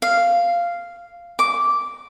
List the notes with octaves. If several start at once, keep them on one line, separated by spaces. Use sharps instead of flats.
F5
D6